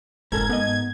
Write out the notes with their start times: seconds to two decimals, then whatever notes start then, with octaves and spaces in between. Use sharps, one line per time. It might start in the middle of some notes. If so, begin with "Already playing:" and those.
0.32 F#1 G#2 A4 A#4 G#6
0.50 G#2 B3 D#5